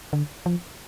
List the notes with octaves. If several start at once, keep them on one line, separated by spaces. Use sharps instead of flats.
D3
F3